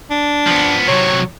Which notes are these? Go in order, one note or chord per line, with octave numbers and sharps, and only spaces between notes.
D4
F3 B3
C3 F#3 C#5